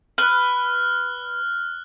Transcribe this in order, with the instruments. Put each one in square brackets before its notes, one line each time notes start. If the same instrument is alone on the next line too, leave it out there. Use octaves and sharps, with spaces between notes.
[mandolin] B4 [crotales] F6 F#6